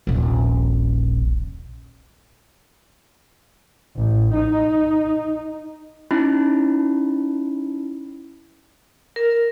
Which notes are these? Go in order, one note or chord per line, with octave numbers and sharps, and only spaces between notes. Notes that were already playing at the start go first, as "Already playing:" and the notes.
D#1 A#1
A1
D#4
C#4 D#4 E4 B5
A#4